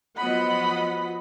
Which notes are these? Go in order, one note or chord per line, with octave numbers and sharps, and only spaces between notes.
F3 F#3 B3 D#5 F#5 B5